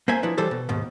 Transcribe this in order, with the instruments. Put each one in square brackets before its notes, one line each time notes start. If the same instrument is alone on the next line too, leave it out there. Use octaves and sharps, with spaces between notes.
[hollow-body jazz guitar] A#3 C5 E5 G#5
F3 D4 E4 B4
E3 G3 A4 C5 D5
B2
D#2 G#2 B2